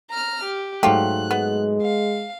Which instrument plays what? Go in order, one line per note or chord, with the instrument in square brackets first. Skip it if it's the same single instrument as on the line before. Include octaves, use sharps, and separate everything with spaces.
[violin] A#5 F6
G4
[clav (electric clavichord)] G#2 F#3 A3 [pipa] F4 G4 [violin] F#6
[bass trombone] G#3 [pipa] B3
[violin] F5